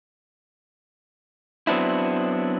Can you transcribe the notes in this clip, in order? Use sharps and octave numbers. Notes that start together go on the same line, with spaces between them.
F#3 B3 C4 D4 E4